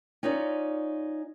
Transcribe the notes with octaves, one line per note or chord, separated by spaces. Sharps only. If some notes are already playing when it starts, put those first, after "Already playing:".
C#4 D#4 F4 C#5 D5